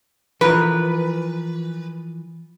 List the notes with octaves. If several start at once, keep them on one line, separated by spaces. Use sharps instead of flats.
E3 F3 A#4 B4